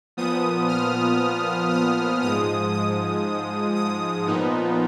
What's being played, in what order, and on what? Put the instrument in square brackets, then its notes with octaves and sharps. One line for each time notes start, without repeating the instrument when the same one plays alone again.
[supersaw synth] A#2 F3 B3 D#6
F6
D#6
G#2 F3 G#3 D#6
D#6
D#6
A#2 F3 B3 D#4